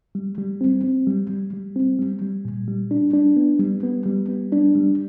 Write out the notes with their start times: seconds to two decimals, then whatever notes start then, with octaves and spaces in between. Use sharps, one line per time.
0.15 G3
0.38 G3
0.61 C4
0.84 C4
1.07 G3
1.30 G3
1.53 G3
1.76 C4
1.99 G3
2.22 G3
2.45 A#2
2.68 G3
2.91 D4
3.13 D4
3.37 B3
3.60 G3
3.83 B3
4.06 G3
4.29 B3
4.52 D4
4.75 G3